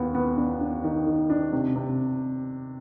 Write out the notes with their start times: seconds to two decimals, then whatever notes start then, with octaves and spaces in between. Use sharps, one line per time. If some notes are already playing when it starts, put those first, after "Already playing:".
Already playing: D#2 B3
0.15 B3
0.37 D4
0.61 D4
0.84 D#3
1.07 D#3
1.30 D4
1.53 C3
1.76 C3